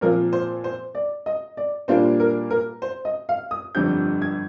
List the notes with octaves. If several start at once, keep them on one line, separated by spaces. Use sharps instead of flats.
A#2 F3 C4 F4 A#4
C5
C5
D5
D#5
D5
A#2 G3 A#3 D4 F4 C5
A#4
A#4
C5
D#5
F5
D#6
G1 F2 D3 G3 C4 G6
G#6